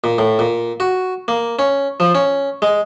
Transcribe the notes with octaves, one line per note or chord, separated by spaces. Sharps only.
A#2
A2
A#2
F#4
A#3
C#4
F3
C#4
G#3